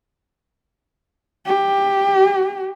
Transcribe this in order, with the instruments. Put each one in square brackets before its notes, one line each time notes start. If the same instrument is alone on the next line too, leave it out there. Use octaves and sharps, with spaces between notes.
[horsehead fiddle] G4